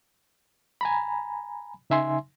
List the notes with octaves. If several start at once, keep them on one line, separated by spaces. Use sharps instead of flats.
G#5 A#5 B5
C#3 D#4 E5 G#5 C6